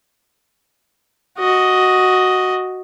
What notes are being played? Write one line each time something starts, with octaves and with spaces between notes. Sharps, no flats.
F#4 D#5